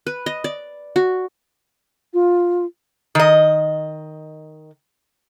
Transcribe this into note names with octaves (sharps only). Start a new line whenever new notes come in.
B4
D#5
D5
F#4
F4
D#3 D#5